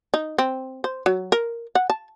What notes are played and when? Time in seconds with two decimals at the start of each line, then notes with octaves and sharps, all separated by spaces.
0.14 D#4
0.38 C4
0.84 C5
1.06 F#3
1.32 A#4
1.75 F#5
1.90 A5